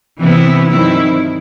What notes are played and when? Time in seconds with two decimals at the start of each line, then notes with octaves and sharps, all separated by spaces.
0.20 C3 E3 B3 E4
0.70 G2 D#3 F#3 C4 E4